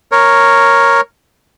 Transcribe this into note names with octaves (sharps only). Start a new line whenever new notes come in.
A#4 C#5